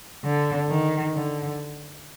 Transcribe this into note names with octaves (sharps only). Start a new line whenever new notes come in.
D3
D#3
D3